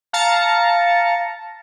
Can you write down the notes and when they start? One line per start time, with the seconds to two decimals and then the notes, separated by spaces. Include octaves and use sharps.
0.13 F5 A5 A#5 A6 C#7